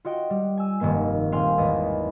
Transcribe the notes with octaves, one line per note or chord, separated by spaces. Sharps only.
F4 F#4 D#5 G5
G3
G#5 E6
F1 G2 D#3 A#3 C7
D#1 C4 F5 G#5 C6 F6
G#1 E2 D#5